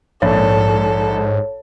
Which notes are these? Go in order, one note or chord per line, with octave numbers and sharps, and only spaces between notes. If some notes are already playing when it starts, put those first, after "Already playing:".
A#1 G#2 A4 C#5